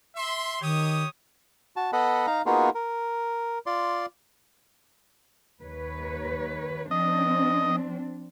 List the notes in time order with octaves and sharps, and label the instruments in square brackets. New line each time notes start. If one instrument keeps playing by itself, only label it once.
[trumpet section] E5 C6
[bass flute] D#3 [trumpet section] G4 C#5 D#6
[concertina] F#4 A5
B3 A4 D#5 F#5 B5
D#4 F5 A#5
A#3 B3 D#4 F4 F#4 G#4
A#4
F4 D5 C6
[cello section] D#2 B4 C#5
[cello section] F3 C4 D4 [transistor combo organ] D#5